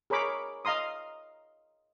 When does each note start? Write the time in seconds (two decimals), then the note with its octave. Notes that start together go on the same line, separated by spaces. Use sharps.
0.10 G#4 A#4 C#5 B5 D6
0.65 D#5 F5 A#5 C6 D#6